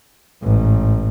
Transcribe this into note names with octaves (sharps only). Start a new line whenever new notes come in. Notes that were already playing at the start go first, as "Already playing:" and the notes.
A1 G#2